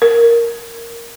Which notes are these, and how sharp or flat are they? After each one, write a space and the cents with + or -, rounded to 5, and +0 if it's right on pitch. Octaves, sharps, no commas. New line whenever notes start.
A#4 +0